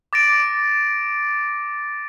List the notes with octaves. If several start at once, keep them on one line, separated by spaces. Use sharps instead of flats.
D6 A6 A#6 D7